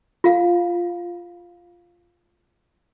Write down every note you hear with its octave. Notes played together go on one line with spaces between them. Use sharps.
F4 F5